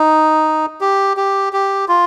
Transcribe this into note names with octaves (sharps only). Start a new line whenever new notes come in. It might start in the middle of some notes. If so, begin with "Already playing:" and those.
Already playing: D#4
G4
G4
G4
F4